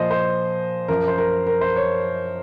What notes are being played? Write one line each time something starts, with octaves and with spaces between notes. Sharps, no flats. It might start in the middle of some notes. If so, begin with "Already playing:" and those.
Already playing: A#2 F3 C5 D#5
C5
F#2 F3 A#4
C5
A#4
A#4
C5
C#5